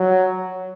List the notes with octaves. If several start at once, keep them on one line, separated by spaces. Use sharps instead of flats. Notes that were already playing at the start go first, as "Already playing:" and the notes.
Already playing: F#3